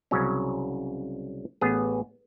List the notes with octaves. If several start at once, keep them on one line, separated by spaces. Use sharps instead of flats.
C2 C#3 F#3 C#4
A1 B3 G#4